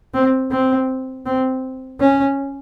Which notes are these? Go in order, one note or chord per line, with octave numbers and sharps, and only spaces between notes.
C4
C4
C4
C#4